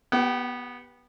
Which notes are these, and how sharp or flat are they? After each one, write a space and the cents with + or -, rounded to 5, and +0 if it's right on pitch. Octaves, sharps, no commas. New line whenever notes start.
B3 -15 G4 +0 F#5 +40